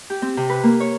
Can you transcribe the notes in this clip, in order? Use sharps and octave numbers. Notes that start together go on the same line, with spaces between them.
G4
C4
C3
B4
A#3
C#5